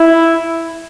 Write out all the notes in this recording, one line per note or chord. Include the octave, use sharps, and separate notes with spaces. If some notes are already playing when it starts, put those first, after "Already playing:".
Already playing: E4